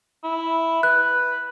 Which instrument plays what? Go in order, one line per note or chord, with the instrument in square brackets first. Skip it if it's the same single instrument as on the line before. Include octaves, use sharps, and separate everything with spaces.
[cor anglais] E4
[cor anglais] B4 [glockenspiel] F#6